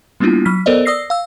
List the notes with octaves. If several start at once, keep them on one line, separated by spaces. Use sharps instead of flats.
G3 A#3 B3 D4 E4 F4
F#3 F6 B6
B3 A4 A#4 C5 D5 D#5
D5 D#6 E6 A#6 C7
F5 E6